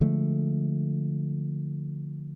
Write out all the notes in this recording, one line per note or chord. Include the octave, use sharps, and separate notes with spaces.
D3 F3 G#3 A3